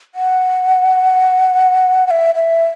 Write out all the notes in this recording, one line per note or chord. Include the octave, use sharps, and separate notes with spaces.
F#5
F#5
E5
E5